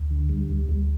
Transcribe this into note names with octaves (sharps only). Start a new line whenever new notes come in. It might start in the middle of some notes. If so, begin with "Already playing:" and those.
Already playing: D2
D3
G3
D2
D2